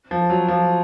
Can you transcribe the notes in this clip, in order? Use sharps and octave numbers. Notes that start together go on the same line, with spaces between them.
F3
F#3
F3